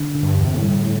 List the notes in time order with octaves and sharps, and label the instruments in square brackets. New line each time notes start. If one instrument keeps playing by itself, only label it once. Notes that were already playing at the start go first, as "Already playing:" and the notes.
Already playing: [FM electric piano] D3
D3
[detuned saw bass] G2
[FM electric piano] E2
[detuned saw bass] C3
A2
[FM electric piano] G3